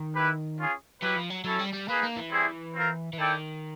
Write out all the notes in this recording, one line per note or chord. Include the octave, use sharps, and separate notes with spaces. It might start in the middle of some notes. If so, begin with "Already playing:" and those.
Already playing: D#3
E4 G4 B4
C#4 F4 G#4
F#3 E4 G4 B4
F3
F#3
F#3 C#4 E4 A4
G3
G3
A#3 D#4 G#4 B4
A#3
E3
G3 C4 E4 G#4
C4 F4 A#4
E3
D#3 E4 A4 D5 G5